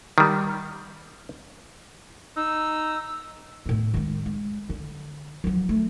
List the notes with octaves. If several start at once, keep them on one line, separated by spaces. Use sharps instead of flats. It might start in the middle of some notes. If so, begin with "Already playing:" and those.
D#3 G3
D#4 E6
A2 B3
D#3 G#3
G#3
D3
F3 F#3
A3